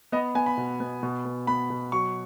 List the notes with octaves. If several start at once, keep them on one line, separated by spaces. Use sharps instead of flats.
B3 D#5
B3 G#5
B5
B2
B3
B2
B3
B3 B5
B2
F#3 C#6